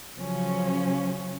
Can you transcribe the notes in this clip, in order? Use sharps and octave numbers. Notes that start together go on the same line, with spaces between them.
C#3 F3 F#3 C#4